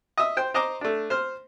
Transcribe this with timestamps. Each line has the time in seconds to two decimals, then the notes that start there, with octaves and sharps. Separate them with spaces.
0.17 D#5 E5
0.37 C5 G5
0.54 C5 D#5 A#5 C6 D6
0.81 A3 D4
1.10 C5 F6